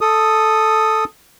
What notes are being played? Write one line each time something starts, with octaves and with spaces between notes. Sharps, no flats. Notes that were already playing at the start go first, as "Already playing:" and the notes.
A4 D#6